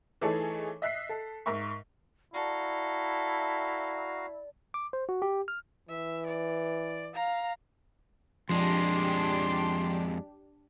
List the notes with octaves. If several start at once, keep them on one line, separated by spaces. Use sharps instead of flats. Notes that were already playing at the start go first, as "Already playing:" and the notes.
E3 A3 D#4 G#4 A4 C#5
D#5 E5 F#6 B6 C7
A4
G#2 A#4 E5 C#6
E4 F#4 A4 D5 F5 A#5
D6
C5
F#4
G4
F6
E3 E5
D5
F5 A#5
F2 F3 G#3 D4 G4 C6